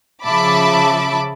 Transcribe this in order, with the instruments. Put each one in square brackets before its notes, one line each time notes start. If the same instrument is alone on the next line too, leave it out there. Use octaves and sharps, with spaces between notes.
[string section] C#3 F3 E5 A5 B5 D6